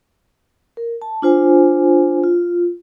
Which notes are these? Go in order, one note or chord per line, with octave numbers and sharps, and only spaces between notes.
A#4
A5
D4 F4 C5 G#5
F4